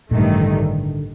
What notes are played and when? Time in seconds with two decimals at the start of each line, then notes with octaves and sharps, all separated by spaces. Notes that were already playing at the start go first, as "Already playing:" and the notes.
0.11 A1 G2 A#2 D#3 A3
0.21 C3
0.31 C3
0.41 D3